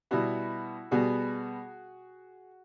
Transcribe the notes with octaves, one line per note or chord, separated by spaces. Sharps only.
B2 G3 B3 E4 F#4
B2 G3 B3 F#4 G#4